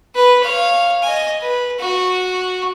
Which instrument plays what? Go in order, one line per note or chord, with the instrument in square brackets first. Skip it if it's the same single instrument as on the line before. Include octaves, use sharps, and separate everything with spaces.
[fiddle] B4
C#5 F5
D#5 G#5
B4
F#4